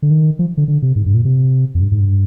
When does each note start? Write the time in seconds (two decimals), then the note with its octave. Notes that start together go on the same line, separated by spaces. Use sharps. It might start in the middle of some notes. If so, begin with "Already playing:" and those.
0.02 D3
0.10 D#3
0.39 F3
0.57 D3
0.68 D3
0.82 C3
0.96 G#2
1.06 G2
1.14 A#2
1.25 C3
1.75 F2
1.81 G2
1.92 G#2
2.01 G2